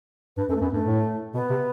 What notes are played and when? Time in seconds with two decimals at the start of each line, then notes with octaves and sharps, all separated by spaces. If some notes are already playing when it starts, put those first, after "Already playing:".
0.37 G2 B4
0.49 F#2 A4
0.56 A3
0.61 F#2 B3
0.73 G2 A3
0.85 A2
1.34 B2 B3
1.50 C3